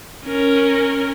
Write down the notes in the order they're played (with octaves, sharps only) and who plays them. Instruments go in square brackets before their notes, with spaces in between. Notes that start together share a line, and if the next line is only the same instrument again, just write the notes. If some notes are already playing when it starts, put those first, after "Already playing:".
[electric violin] C#4 A#4